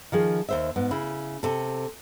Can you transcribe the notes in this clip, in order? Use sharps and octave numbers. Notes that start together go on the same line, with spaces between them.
D#3 F3 G#4
D#2 C5 E5
G#2 B3
C#3 E4
C3 A4